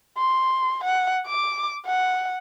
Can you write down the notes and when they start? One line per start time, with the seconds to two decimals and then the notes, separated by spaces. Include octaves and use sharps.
0.17 C6
0.84 F#5
1.27 D6
1.86 F#5